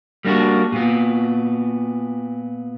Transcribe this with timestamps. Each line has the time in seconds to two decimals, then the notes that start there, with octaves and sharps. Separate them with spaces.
0.25 G3 A#3 D4 E4 F#4
0.72 A#2 B3